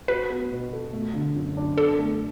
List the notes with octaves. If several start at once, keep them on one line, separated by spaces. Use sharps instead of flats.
F#4 B4
B3
B2
A4
A3
D3
F#2
D4
D4 A4
A3